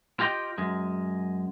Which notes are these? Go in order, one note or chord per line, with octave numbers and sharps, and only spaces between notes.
F4 G4 D#5 F#5 G5
F#2 G#3